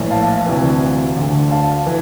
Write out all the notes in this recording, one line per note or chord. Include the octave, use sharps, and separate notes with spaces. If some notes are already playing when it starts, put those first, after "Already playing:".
Already playing: A#1 A2 E3
F5 A5
D2 C3 E3
D2 D3
F5 A5
E3